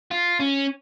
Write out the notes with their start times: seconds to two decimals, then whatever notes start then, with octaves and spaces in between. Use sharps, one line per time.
0.11 F4
0.40 C#4